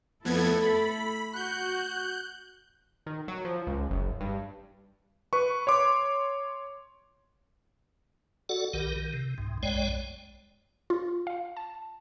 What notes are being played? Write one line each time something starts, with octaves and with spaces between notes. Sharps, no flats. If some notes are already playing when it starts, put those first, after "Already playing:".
F2 A3 B3 E4 A4 G#6
B5
F#4 F#6 G6
D#3
F#3
F3
C#2
F#1
G2
B4 C#6
C#5 C6 D6
F#4 A4 D5 F#5
B1 D#3 G4 A#4
D#3
C3
C2 G#2
B1 F#2 G#3 C#5 D5 G5
F4
F5
A5